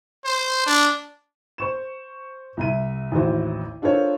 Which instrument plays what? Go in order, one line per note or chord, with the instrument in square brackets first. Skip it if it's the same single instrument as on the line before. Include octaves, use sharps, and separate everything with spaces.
[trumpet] C5
D4
[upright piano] C5 C#6 E7
C2 E5 D#7
A1 D#2 E4 F#4 C5
D4 F4 A4 A#4 C5 C#5